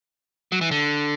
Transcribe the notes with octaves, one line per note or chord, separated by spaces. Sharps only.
F#3
E3
D3